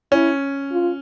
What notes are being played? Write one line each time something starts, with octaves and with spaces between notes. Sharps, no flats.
C#4 E4
F4